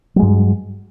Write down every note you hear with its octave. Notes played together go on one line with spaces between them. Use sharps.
G2 F#3 G#3